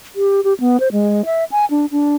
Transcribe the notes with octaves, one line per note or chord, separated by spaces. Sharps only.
G4
G4
B3
C5
G#3
E5
G#5
D4
D4